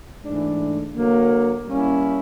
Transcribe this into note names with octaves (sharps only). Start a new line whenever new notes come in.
G#2 E3 A3 D4
D3 F#3 A#3
G3 A#3 C#4 E4